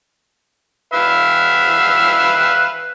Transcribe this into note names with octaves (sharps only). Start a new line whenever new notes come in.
B4 E5 F5